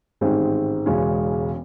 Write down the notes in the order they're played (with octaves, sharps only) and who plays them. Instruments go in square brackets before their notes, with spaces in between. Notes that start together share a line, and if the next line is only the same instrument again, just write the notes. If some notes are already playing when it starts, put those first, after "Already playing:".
[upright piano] A1 G#2 D#3 G#3 C4
E1 E2 C#3 G#3 C#4